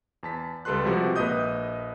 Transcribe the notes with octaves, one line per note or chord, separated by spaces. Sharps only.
E2 A5 B6
C#2 G3 A4 B4 C6 F#6
C3 F3 G#3 F#4 G4 B4
A#1 A#3 B4 D#5 D#6 G6